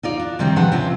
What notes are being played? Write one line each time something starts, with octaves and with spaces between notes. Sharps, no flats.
D#4 F4 D5
D4
C3 D#3 G3 C4
G#2 F3 D4 B4 F#5
C3 C4 C#4 F4